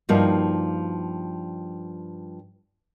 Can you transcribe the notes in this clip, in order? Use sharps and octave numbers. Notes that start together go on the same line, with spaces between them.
G2 F3 A#3 D#4 F#4